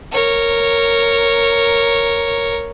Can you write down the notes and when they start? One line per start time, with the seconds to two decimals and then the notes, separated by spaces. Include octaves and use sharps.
0.12 A#4 C#5